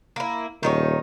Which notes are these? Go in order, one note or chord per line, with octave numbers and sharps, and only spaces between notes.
A#3 E4
D#1 D#3 D#4 C#5